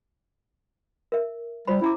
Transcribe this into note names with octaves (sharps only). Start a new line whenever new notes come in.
A#4 E5
G3 F4 C5 B5
C#4 E4 A#5 D6